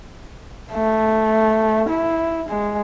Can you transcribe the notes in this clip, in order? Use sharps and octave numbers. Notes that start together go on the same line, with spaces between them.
A3
E4
G#3